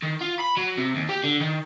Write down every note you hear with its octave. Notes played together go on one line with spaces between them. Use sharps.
D#3
F4
B5
F#3
C3
D#2
G4
D3
D#3